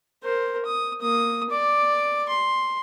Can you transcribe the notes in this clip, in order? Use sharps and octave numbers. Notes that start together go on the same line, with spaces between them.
A#4 C5
D#6
A#3 D#6
D5 D6
C6